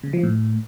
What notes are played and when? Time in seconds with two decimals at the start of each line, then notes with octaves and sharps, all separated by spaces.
0.03 C#3
0.13 F3
0.23 A2